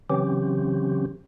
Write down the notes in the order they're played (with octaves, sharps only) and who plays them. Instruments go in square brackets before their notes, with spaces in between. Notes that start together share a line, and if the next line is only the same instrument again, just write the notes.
[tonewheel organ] C#3 E3 F#3 C4 C#4 G4